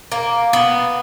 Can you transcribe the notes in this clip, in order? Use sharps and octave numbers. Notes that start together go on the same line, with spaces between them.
A#3
B3